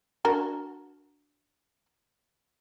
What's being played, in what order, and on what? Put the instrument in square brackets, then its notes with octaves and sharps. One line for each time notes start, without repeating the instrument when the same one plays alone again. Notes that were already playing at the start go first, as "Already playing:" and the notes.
[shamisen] D4 F#4 A#4